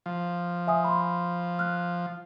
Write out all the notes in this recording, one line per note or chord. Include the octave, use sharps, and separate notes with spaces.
F3
E5 G#5 D#6
B5 C6
F6 F#6